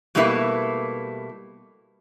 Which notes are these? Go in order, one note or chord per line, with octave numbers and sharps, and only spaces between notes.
B2 G3 A3 A#3 E4 B4